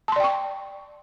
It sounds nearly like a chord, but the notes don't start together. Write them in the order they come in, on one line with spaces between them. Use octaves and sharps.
A5 C6 D5 G5 C#6